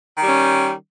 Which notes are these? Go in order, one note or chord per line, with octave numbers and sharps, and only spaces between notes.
D#3 G3 C#4